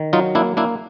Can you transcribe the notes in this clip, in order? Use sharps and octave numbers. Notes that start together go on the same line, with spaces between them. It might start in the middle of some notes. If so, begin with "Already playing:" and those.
Already playing: D#3
F#3 D#4 F4
A#3 D4 E4
A#3 D4 E4